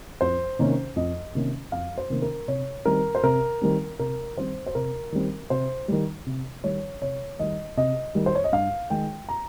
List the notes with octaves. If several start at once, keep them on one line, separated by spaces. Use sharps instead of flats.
F2 C5
C3 D#3 A#3 C#4
F2 D#5
C3 D#3 A#3 C#4
F2 F5
C5
C3 D#3 A#3 C#4
A#4
C3 C#5
D#3 G3 C4 A#4
C5
C3 A#4
D#3 G3 C4
C3 A#4
D#3 G3 C4 C5
C5
C3 A#4
D#3 G3 C4
C3 C5
D#3 G3
C3
D#3 G3 C#5
C3 C#5
D#3 G3 D#5
C3 D#5
D#3 G3
C5
C#5
D#5
G2 F5
D#3 G#3 G5
A#5